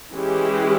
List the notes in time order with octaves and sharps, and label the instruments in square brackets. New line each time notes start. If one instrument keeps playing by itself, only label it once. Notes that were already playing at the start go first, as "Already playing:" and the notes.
[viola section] E3 G#3 C#4 E4 G4